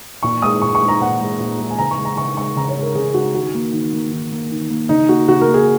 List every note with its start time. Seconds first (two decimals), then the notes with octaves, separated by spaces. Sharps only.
0.23 A#2 C#6
0.42 G#3 D#6
0.62 A#2 C#6
0.75 C#6
0.82 G#3
0.88 A#5
1.00 A#2 F#5
1.20 G#3
1.40 A#2
1.59 G#3
1.70 G#5
1.78 C#3 A#5
1.91 C#6
1.98 G#3
2.05 A#5
2.17 C#3 C#6
2.37 G#3 C#6
2.56 C#3 A#5
2.69 C#5
2.76 G#3
2.82 A#4
2.95 C#3 G#4
3.14 G#3 F#4
3.34 D#3 F#4
3.54 A#3
3.73 D#3
3.93 A#3
4.12 D#3
4.32 A#3
4.51 D#3
4.70 A#3
4.89 C#3 D#4
5.09 A#3 F#4
5.28 C#3 F#4
5.41 A#4
5.48 A#3
5.54 G#4